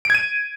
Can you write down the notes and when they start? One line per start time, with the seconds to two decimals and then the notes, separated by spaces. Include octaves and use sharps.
0.05 D7
0.10 G#6
0.15 D#7